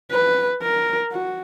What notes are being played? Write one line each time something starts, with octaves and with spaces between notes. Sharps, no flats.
B4
A#4
F#4